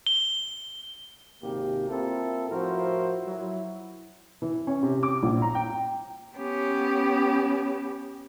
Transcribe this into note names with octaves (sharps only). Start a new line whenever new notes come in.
G7
G#1 C3 A#3 G4
A#3 C4 E4 F4 A4 A#4
A2 F3 E4 F#4 A#4 C5
F#3 E4
E3
C#4
C3
D6
A#1
A#5
G5
B3 C#4 G4